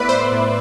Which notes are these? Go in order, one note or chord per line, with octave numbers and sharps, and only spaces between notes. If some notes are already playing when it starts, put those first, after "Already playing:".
Already playing: A2 B3 B4 D5 E5
C5
A2